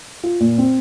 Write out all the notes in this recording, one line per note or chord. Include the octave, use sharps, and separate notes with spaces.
F4
A#2
C4